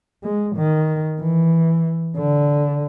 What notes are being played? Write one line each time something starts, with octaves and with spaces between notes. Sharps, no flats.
G#3
D#3
E3
D3